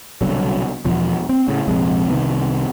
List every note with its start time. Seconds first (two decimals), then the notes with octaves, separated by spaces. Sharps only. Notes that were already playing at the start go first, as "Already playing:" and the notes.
0.21 C2 B2 D3 F#3
0.85 E2 B2 F3
1.29 C4
1.48 A2 C#3
1.68 A#1 F2 C3 G#3
2.09 C2 C3 D#3 B3